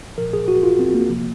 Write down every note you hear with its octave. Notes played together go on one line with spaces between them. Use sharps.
A#2 F3 A#4
G#4
F#4
F4
C4
A#3
C3 F3